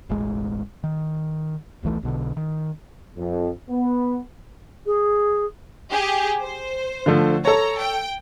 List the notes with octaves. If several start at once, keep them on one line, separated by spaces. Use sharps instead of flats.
E1 A1 G#3
D#3
D#1 B1 E3 A3
B1 B2 D3
D#3
F2
B3
G#4
G4 G#4
C5
D3 F3 A3
A4 C#5 A#5
G5